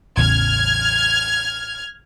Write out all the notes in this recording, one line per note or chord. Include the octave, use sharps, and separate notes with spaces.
A1 E2 C#3 F6 G#6